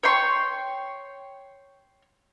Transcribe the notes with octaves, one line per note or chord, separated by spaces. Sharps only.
C#5 G5 C6 C#6